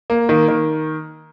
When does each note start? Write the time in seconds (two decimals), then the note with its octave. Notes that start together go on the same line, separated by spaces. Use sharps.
0.10 A#3
0.29 D#3
0.48 D#3